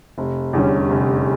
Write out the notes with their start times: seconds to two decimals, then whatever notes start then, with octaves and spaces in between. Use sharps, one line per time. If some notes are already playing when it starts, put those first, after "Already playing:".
0.18 F1
0.53 E2 D3 G3 C#4
0.90 F1